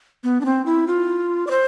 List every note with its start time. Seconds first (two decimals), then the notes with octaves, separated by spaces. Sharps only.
0.24 B3
0.41 D4
0.45 C4
0.66 E4
0.87 F4
1.47 D5
1.51 C5